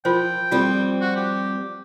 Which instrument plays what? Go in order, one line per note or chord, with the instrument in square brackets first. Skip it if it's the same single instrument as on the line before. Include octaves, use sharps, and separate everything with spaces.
[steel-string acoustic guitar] F3 [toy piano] F4 A#4 C5 [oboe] G5
[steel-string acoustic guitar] F2 G3 C4 [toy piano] F4 A4
[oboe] F#4
G4